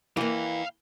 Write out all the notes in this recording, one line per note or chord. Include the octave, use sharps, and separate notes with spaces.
E3 A#3 F5 G5